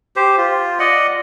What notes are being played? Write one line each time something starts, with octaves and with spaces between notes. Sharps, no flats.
G4 C5
F4
D5 D#5 F#5